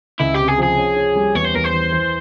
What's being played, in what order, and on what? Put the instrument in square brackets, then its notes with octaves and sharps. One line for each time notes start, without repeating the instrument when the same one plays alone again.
[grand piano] C#2 [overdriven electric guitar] E4
[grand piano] C3 [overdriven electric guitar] G4
[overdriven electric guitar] G#4
[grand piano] F3 [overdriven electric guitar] G#4
[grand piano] C#4
C#4
G3
[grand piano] E2 [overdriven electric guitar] C#5
[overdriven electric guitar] C5
[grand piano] E2 [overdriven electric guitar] A#4
[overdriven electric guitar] C5
[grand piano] E3
E3